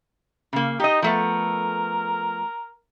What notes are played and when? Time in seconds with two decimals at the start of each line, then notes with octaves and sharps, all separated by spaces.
0.53 C#3 A#3
0.80 D#4 G4 D#5
1.02 F3 A3 B3 A#4